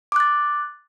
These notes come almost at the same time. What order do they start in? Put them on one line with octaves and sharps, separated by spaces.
D6 F#6 A6